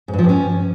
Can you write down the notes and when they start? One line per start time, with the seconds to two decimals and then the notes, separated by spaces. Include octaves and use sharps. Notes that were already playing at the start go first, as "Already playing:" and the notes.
0.08 G#2
0.13 G2
0.19 F3
0.24 G2
0.29 C#4